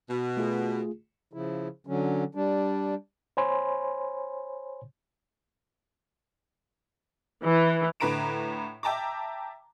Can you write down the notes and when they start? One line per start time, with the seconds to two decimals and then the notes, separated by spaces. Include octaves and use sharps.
0.10 B2
0.37 A3 F4 G#4
1.33 C#3 F3 E4
1.87 D3 F#3 C#4
2.35 G3 D4
3.37 C5 C#5 G#5 B5 C6
7.43 E3
8.00 A2 D3 B4 A#5 D7 E7
8.83 E5 G5 A5 A#5 D6